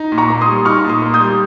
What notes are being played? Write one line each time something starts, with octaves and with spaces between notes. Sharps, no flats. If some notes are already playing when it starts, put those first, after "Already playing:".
Already playing: D#4
A#2
A#5 C#6
A#3
C6 D#6
G3
D#4 C#6 F6
A#2
C6 D#6
A#3
D#6 G6
G3